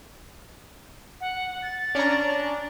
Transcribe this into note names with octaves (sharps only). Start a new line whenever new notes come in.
F#5
A6
C#4 D4 A#5